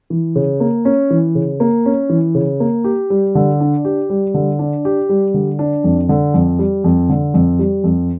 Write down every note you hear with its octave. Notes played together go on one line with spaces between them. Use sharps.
E3
C#3
A#3
C#4
E3
C#3
A#3
C#4
E3
C#3
A#3
G4
G3
D3
D4
G4
G3
D3
D4
G4
G3
D3
D4
F2
D3
F2
G3
F2
D3
F2
G3
F2